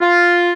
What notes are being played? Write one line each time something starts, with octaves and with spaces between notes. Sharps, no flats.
F4